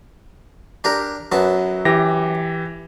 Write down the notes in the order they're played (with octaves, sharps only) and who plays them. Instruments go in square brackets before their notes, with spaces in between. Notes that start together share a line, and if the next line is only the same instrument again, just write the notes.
[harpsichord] D4 G4 A#4
[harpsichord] F#2 B3 A5 [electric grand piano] F#3
[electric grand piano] E3 G4 A#6